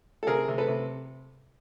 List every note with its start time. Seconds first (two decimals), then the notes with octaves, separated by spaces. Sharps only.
0.23 A4
0.27 C3 G#4 A#4
0.48 C3
0.58 A4 B4
0.68 C3